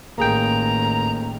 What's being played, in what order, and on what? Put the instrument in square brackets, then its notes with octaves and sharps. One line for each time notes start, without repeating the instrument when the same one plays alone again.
[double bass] A1 D#3 [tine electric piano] A#3 G#4 G5 [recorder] A#5